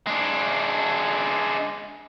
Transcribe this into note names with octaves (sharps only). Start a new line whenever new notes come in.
G#3 D4